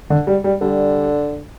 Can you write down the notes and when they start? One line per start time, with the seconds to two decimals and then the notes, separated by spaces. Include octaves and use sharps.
0.10 D3
0.27 G3
0.44 G3
0.61 D3 G3